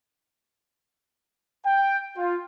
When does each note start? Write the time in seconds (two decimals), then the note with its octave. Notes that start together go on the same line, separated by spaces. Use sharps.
1.65 G5
2.16 F4